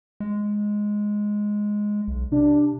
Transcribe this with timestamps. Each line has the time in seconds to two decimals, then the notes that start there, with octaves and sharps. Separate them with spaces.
0.20 G#3
2.08 B1
2.32 C3 D4